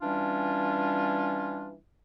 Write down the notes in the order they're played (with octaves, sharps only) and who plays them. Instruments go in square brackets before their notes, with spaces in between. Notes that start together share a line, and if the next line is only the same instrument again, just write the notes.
[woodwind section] E3 G3 C#4 D4 F4